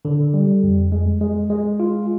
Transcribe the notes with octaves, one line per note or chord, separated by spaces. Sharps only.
D3
G3
F2
G#3
G#3
G#3
F4